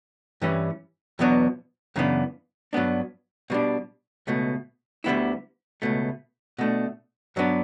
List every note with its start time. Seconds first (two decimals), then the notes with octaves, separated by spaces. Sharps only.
0.42 G2 E3 G3 C#4
1.19 E2 B2 F#3 B3 D4
1.96 F#2 C#3 E3 B3 D4
2.73 G2 F#3 B3 D4
3.50 B2 G3 D4
4.27 C#2 B2 A3
5.04 D2 D3 G3 B3 E4
5.82 C#2 B2 A3
6.59 B2 A3 D4
7.36 G2 F#3 B3 D4